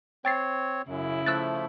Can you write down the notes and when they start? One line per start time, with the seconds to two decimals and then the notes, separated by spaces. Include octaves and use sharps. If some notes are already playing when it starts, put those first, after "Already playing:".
0.25 C4 C#5 G5 A6 C7
0.89 F#2 C#3 E4
1.26 F3 A3 E6 F#6 A6